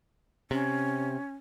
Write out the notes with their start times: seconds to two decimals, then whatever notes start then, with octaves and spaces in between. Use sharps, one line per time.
0.51 C3 C#4